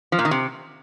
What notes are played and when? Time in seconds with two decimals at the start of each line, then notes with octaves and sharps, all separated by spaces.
0.12 F3
0.19 A#2
0.25 D#3
0.31 C3